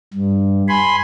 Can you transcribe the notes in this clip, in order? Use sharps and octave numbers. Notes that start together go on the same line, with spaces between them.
G2
G#5 B5 C6